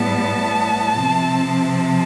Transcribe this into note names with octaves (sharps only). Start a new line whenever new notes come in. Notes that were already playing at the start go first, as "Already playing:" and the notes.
Already playing: A2 G3 B3 A5
C3 F3 C4